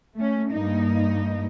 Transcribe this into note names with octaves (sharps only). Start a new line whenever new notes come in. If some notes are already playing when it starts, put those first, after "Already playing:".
A3 C#4
G2 A#3 D#4